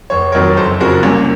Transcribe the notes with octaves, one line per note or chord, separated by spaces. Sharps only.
F1 C#5
F2 D#3 F#3 A#4 C#5
F#1 A4 C5
F2 C#3 F3 F#4 A#4
C2 A#3 C#4